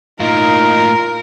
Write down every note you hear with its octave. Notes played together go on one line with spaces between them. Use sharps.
A2 A#3 D#4 F4 A#4